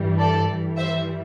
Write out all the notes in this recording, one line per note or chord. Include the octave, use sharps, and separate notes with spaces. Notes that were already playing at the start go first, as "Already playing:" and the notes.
Already playing: G2 E3 G3
A4 D5
G2 E3 G3
C5 E5